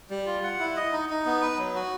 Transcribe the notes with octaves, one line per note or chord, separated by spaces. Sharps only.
G3
F4
F#5
E4
D#5
D#4
D#4
B3
B4
F#3
F#4